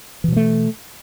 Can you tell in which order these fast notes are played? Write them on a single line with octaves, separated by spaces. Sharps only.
E3 B2 F#3 A3